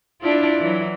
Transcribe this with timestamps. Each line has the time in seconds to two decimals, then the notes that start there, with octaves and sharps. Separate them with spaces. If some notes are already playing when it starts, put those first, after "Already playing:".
0.21 D4 E4 F4
0.59 E3 F#3